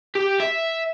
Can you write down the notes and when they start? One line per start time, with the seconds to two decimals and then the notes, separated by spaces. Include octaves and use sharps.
0.15 G4
0.40 E5